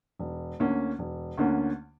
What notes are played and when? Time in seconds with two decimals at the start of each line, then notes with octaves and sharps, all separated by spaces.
0.19 E1
0.59 D2 D3 A#3 C#4
0.99 E1
1.38 D2 D3 A#3 C#4